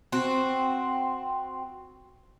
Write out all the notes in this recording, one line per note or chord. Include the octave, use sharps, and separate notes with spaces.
C4 F#4